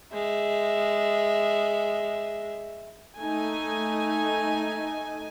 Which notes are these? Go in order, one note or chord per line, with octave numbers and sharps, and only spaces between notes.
G#3 E5
A3 D#4 G#5